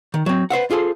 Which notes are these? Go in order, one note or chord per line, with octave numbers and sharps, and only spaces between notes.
D#3
F#3 C4
B4 C5 E5 F#5
F4 G#4 A4 C5